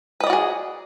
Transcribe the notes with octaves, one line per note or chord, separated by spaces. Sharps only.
F#4 G#4 B4 D5 D#5